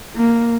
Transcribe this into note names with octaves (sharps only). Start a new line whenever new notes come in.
A#3